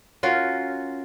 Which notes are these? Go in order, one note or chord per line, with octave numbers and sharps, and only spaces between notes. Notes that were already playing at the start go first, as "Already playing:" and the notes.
C#4 F4 F#4 A#4